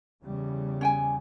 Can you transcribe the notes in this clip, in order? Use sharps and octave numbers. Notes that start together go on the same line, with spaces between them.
E2 C#3 G3
C#4 G5 G#5